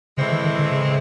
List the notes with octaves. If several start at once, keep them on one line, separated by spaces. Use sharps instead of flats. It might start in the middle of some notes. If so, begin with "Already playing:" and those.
A2 C#3 E3 G#3 C4 E4
D#3
D#3
D3
C#3